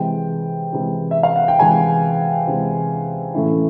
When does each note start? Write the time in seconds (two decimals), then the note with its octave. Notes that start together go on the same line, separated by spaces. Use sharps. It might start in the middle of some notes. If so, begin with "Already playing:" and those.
Already playing: C3 E3 G#3 G5
0.73 C3 E3 G#3
1.11 E5
1.23 F5
1.36 F#5
1.48 G5
1.59 C3 E3 G#3 G#5
2.47 C3 E3 G#3
3.34 A2 E3 A3 C#4 E4